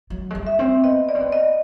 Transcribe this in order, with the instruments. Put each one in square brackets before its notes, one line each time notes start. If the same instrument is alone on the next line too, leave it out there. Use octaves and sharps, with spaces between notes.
[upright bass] F#3
G#3
G3
[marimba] E5
[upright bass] C4
[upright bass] B3 [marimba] D#5
[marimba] D5
[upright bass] C4
B3
[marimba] D#5